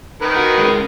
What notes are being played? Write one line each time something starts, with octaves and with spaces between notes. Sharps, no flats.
D#3 A#4 B4
F#4
G#3 C#4